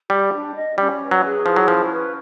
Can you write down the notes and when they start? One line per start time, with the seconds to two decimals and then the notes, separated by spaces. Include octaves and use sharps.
0.10 G3 G4
0.32 D4
0.55 D#5
0.78 G3 C#4
1.01 B4
1.11 F#3
1.23 G#4
1.45 F3 E4
1.56 F#3
1.68 F3 C#4
1.91 B4